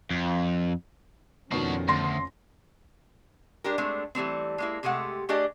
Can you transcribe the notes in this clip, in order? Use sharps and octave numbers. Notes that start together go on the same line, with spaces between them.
F2
F2 B2 D#3 C#4 D4 F#4 C7
D2 C6 A#6
G#3 D4 G4 A#4
G#3 A3 C4 D4
E3 G3 A3 C4
G#3 A#3 E4
C3 G#3 A3 G4 F#5
A3 D4 G4 G#4 D5 D#5